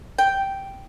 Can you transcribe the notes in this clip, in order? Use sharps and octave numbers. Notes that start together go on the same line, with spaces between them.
G5